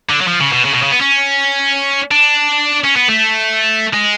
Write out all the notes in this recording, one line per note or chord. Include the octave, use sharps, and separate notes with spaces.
D3
F#3
F3
C#3
B2
C#3
B2
C#3
B3
C#4
D4
C#4
B3
A3
G#3